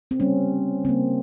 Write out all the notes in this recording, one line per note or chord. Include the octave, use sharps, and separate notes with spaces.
C4
C#3 G3 A#3 C#4
C#3 G3 A#3 C4